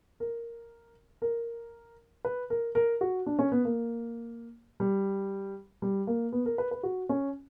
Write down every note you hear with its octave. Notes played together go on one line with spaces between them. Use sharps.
A#4
A#4
B4
A#4
A#4
F#4
D4
C#4
B3
A#3
G3
G3
A#3
B3
A#4
B4
B4
F#4
C#4